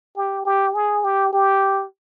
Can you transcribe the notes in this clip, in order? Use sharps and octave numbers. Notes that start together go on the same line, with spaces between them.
G4
G4
G#4
G4
G4